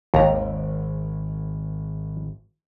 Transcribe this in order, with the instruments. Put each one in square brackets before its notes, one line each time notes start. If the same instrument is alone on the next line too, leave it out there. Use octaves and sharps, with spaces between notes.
[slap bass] G#1 [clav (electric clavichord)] D#2 A#5